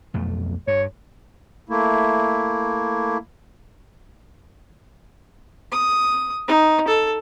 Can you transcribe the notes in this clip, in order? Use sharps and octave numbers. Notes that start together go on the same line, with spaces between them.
B1 F2 A3
G2 C#5
A3 A#3 E4
D#6
D#4
A4